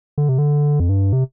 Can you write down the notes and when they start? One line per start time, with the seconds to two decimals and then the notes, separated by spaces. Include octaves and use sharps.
0.18 D3
0.29 C3
0.38 D3
0.80 F2
0.89 G2
1.13 C3